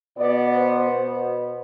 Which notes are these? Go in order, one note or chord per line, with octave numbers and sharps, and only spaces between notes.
B2 B3 D5
C5
B2 B3